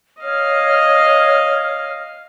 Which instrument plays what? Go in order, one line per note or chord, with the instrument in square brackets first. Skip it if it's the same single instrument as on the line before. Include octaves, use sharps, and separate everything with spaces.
[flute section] C#5 F6 [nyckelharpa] D#5 F5